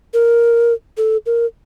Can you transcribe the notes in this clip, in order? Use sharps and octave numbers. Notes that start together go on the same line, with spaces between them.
A#4
A4
A#4